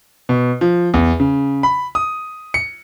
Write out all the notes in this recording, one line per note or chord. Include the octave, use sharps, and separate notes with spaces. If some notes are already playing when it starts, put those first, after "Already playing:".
B2
F3
E2
C#3
B5
D#6
C#7